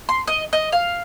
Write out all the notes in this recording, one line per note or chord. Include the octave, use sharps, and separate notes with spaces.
C6
D#5
D#5
F5